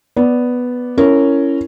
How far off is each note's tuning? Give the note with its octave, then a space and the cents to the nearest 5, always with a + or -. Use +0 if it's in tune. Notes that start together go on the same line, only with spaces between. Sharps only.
B3 +0 D5 -5
C#4 +0 E4 +10 A#4 -15